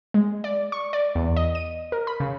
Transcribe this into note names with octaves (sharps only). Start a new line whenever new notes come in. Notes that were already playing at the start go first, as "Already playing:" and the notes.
G#3
D5
C#6
D5
E2
D#5
D#7
A#4
B5
C#3